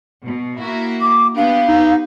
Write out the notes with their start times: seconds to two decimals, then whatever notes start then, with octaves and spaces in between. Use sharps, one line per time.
0.25 B2
0.59 A#3 E4 F#4
1.01 D6
1.36 B3 D4 G4 F5
1.68 D#4